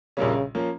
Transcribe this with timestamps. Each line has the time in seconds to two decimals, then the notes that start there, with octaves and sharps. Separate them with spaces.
0.17 A#1 A#2 C#3 G3 A#3 C#4
0.55 F3 A#3 C#4